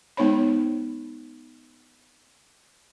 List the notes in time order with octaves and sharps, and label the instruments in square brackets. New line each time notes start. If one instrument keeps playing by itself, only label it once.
[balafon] G#3 B3 D#4 C5 C#5 B5